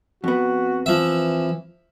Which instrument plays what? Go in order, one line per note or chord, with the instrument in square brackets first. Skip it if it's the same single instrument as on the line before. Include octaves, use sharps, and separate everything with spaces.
[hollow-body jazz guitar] F2 B3 [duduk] F#4
[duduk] E3 [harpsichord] F3 E5